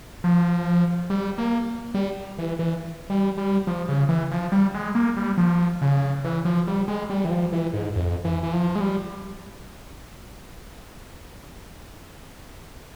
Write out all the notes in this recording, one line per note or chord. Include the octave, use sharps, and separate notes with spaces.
F3
G3
A#3
G3
E3
E3
G3
G3
F3
C#3
E3
F3
G3
G#3
A#3
G3
F3
C#3
E3
F3
G3
G#3
G3
E3
F3
E3
G#2
F2
E3
E3
F3
G#3
G3